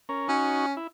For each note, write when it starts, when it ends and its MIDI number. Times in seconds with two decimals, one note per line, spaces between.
0.09 0.28 61
0.09 0.28 70
0.28 0.74 61
0.28 0.66 63
0.28 0.66 66
0.28 0.66 73
0.77 0.87 64